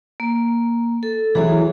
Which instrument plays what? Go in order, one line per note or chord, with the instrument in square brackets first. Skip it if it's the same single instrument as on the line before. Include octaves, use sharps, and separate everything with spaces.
[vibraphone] A#3
A4
[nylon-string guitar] E3 F#3 E4 [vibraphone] G#4